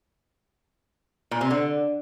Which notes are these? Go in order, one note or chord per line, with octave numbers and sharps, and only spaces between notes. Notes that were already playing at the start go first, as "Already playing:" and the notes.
A#2
C3
D3